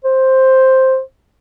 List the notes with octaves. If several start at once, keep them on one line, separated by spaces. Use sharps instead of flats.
C5